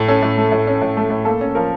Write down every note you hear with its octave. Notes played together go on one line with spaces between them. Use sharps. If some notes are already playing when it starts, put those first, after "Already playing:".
Already playing: A2
C#4 A4
A2
A3
A2
C#4
A2
A3
A2
A#3 A4
C#4
F3 A#4